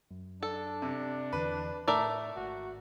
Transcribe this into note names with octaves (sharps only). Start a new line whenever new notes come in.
F#2
D4 A4
C3
E2 D3 E3 B4
A2 A3 A#4 D5 E6
G#1 F#4